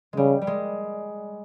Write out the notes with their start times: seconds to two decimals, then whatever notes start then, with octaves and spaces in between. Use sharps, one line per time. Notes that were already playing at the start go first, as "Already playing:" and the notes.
0.13 C#3 G3 G#3
0.42 G3
0.47 G#3